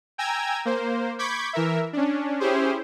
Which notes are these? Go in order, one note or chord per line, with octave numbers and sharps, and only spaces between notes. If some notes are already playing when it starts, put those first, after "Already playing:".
G5 G#5 A#5 E6 G#6
A#3 C5
B5 C#6 D6 G6 G#6 B6
E3 A#4 E5
C#4 D4
C#4 E4 G4 G#4 C5